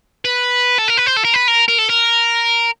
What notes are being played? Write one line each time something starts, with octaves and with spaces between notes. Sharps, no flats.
B4
A4
A#4
B4
C5
A4
A#4
B4
A#4
A#4
A4
A#4